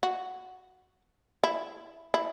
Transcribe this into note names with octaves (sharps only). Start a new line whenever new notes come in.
F#4
E4
E4